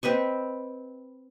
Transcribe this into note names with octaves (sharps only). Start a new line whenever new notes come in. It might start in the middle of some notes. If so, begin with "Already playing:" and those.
C4 B4 D#5 C#6